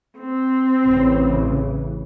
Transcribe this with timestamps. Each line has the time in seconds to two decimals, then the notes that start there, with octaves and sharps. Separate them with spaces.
0.18 C4
0.85 A1 C#3 E3